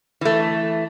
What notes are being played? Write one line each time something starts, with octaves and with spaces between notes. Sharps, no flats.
E3 A3